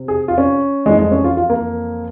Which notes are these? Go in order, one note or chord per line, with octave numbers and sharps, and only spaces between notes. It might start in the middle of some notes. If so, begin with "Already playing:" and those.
Already playing: C3
G#4
F4
C#4
F2 E3 G#3
G#3
C#4
F4
F4
A#3